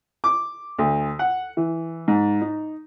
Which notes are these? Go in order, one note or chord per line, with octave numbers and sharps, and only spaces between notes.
D6
D2
F#5
E3
G#2
D#4